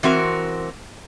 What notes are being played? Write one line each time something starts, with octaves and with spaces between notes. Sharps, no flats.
E3 C4 F#4 A#4